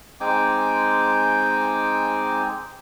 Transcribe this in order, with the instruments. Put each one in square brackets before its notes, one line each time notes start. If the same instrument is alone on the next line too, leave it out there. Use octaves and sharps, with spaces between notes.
[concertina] G#3 C4 D#4 G5 G#5 D6